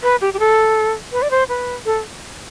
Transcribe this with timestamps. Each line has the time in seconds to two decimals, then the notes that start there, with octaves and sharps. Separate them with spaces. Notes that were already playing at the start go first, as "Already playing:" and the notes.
0.03 B4
0.21 G4
0.33 G4
0.39 A4
1.12 B4
1.22 D5
1.31 C5
1.49 B4
1.85 A4